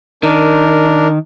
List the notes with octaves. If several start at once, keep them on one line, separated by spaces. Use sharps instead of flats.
D#3 D4 A#4